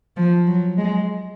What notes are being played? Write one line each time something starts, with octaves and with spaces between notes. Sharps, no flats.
F3
F#3
G#3